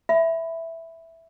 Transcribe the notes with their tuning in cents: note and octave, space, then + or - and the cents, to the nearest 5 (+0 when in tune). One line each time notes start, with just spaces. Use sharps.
E5 +0 B5 +10